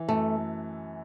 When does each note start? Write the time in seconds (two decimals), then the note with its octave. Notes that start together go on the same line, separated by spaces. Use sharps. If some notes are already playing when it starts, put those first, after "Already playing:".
Already playing: E3
0.08 F#2 A3